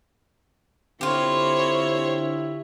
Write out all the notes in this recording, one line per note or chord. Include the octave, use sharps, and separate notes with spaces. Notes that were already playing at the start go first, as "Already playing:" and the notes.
D3 C4 E4 F4 G4 C#5